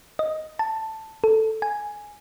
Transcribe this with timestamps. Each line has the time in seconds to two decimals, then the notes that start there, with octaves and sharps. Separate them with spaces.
0.19 D#5
0.59 A5
1.24 A4
1.62 G#5